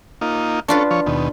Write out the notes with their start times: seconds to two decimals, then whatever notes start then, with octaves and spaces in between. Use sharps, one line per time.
0.21 A#3 D#4 F4
0.68 C#4 D4 F4 A4 B4
0.91 F3 C#5
1.06 D#2 B2